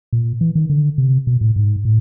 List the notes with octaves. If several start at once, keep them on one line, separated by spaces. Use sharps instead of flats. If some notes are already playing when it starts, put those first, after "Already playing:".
A#2
E3
D#3
D3
C3
B2
A2
G#2
A2